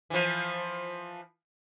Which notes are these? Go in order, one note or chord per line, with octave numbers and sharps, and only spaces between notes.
E3 F3